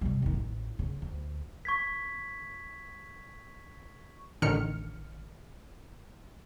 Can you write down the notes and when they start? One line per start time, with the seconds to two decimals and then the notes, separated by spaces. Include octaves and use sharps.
0.01 C3 G3
0.22 E2 D#3
0.34 A1
0.79 C#3
1.02 D2
1.65 C#6 G#6 B6
4.42 A1 D3 D#3 F6 C#7